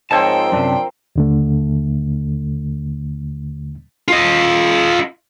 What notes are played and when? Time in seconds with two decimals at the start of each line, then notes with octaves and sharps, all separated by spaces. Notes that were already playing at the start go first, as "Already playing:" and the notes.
0.11 G#2 F3 C4 A#4 C#5 G5 A5
0.52 F#2 C3 D4
1.16 D#2 D3 A3
4.08 F4 D#5